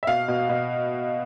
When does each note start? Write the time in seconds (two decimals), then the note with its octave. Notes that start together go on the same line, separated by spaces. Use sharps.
0.03 E5
0.07 B2 F5
0.28 B2
0.49 B2